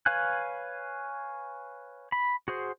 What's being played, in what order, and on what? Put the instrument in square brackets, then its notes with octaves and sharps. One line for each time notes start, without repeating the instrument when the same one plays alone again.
[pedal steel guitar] B4 C#5 F5 G#5 F#6
B5
F#4 G#4 C5